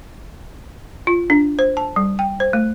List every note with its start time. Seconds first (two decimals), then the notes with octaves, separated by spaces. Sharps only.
1.07 F4
1.30 D4
1.59 C5
1.77 A5
1.96 G3
2.19 G5
2.40 C5
2.53 A3